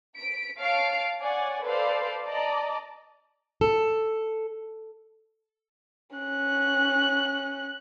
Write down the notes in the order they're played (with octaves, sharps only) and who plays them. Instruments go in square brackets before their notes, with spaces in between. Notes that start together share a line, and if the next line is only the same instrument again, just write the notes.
[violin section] B6 D7
C#5 F5 A5 F6 C7 D7
C#5 D5 F#5 G#5
A4 B4 C5 D5 F5
D5 D#5 A5 A#5
[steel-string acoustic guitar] A4
[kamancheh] C#4 F#6